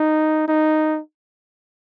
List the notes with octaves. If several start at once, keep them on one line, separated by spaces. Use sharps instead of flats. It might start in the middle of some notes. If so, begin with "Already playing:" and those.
Already playing: D#4
D#4